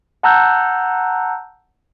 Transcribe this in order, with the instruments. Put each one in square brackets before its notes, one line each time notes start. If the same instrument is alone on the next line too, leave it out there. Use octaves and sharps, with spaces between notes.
[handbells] F#5 A5 A#5 E6 F#6 G6